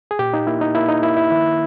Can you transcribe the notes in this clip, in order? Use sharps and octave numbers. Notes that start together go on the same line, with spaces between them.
G#4
A#2 G4
D#4
A#3 E4
D#4
A#3 E4
D#4
A#3 E4
E4
D#3 E4